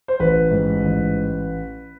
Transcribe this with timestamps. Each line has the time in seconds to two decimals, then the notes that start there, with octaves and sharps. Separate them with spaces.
0.08 C5
0.20 A1 B4
0.51 G#2
0.83 A1